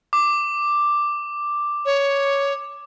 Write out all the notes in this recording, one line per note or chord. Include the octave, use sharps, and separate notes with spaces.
D6
C#5